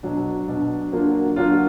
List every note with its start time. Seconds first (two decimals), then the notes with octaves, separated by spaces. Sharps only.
0.03 B2 F#3 D4
0.48 B2 F#3 D4
0.92 D3 F#3 A#3 D4 F4
1.36 D3 F#3 A#3 D4 F4